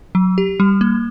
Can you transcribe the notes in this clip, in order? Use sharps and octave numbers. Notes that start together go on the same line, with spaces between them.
F#3
G4
G3
A#3